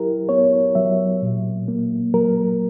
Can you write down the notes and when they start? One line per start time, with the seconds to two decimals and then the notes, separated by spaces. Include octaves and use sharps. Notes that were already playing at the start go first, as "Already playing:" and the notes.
Already playing: F#3 E4 G4 A#4
0.29 B3 C#5
0.75 F#3 E5
1.22 A#2
1.68 A#3
2.14 F#3 A#4